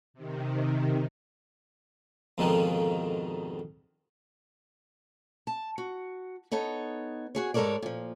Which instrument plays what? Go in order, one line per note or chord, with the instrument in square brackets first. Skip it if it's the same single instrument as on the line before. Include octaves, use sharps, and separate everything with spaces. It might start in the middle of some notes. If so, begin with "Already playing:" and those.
[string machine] C3 D#3
[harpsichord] F2 G#2 B2 D3 D#3 F3
[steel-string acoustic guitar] A5
F#4
B3 D#4 A4 C#5
F#4 G#4 C#5
G#2 G#3 A4 A#4 C#5 D5
A#2 F3